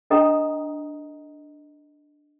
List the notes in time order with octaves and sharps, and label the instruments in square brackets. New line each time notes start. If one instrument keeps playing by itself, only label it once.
[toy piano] D4 A4 D#5 G5 A#5 D#6